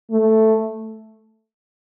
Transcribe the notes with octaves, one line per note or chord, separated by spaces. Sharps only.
A3